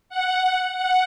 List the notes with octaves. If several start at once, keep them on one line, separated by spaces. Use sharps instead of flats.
F#5
F#5